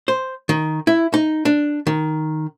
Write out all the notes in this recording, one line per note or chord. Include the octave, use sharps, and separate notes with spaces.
C5
D#3
E4
D#4
D4
D#3